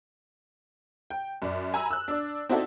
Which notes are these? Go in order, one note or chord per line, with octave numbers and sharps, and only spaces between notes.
G5
F#2 D5
G#5 A#5 B5 E6
E6 F#6
D4 D5
C4 D#4 E4 F#4 A4 D5